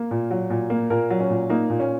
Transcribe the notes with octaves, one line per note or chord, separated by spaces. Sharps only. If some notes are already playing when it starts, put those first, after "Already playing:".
Already playing: A#3
A#2
F#3
A#2
A#3
A#2 A#4
F#3
C#4
A#2
A#3 D#4
A#2
C#4